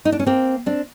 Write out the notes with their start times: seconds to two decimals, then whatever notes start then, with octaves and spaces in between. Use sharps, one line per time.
0.05 D#4
0.12 D4
0.19 C#4
0.26 A#3 C4
0.66 C4 D4